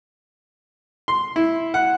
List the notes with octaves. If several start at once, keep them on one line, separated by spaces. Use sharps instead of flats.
C6
E4
F#5